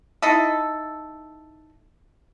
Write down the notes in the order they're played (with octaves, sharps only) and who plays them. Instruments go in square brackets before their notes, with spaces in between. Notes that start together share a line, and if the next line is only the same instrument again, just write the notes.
[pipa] D#4 E4 A4